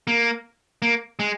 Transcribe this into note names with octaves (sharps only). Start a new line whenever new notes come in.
A#3
A#3
G#3